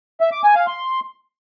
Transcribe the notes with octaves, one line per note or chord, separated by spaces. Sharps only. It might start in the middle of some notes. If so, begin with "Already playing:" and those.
E5
D6
G#5
F5
C6